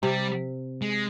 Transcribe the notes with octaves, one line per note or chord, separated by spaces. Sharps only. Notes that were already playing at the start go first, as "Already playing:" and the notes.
C3 G3
G#3